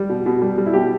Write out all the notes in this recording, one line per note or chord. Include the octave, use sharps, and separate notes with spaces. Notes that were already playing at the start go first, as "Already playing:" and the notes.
Already playing: G3
B2
B2
G3
G3
E4
B2 G4